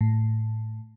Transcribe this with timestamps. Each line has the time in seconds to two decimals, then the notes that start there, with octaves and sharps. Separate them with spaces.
0.01 A2